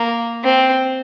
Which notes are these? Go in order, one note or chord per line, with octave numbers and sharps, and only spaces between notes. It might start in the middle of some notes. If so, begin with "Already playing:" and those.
Already playing: A#3
C4